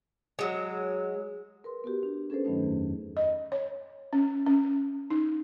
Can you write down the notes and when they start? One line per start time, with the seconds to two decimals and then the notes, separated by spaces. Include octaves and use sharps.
0.39 F#3 G#3
1.64 A#4 B4 C6
1.84 B3 F#4 G4
2.03 D4
2.30 C#4 G#4 A4 B4 C5
2.45 G2 D#3 F#3 A3 C#4 D#4
2.59 F2 D#3
3.17 D#5
3.52 C#5
4.13 C#4
4.46 C#4
5.10 D#4